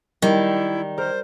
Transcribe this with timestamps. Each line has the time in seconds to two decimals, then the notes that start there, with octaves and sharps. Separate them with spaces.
0.22 D#3 G3 E4
0.98 A#4 C5